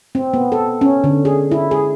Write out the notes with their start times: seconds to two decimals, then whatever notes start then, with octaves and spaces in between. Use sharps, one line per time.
0.15 C4
0.34 B3
0.52 A4
0.81 C#4
1.04 D3
1.25 G#4
1.52 E4
1.71 G#4